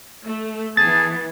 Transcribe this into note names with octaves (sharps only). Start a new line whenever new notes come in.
A3
E3 B3 G#4 A5 A6